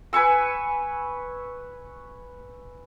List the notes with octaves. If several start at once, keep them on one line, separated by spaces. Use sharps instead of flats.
B4 G#5 C#6 E6